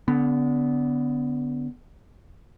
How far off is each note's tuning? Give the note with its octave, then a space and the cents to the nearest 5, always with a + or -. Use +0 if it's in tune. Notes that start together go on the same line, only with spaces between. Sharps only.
D3 -25 B3 +10